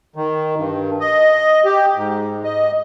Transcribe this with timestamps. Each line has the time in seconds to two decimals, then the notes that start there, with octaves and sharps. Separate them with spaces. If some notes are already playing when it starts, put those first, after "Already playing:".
0.16 D#3
0.58 G2
1.00 D#5
1.65 G4
1.96 G#2
2.44 D#5